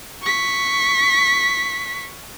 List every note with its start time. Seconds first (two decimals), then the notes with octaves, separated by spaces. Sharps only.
0.22 C#6 B6